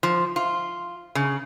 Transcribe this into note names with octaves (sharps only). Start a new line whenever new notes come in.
F3
F4
C#3